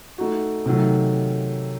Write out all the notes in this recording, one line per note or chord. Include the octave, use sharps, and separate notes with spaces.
A3 D#4 F#4
C3 D#3 F#3 A3